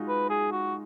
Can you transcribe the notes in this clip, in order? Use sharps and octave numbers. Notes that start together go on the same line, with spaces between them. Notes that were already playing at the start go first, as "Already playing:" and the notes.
Already playing: G#3 D#4 F4 F#4
B4
G#4
F#4